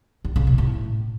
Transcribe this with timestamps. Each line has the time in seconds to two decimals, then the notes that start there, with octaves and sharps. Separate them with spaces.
0.25 D#3
0.36 C#3
0.47 B2
0.58 A2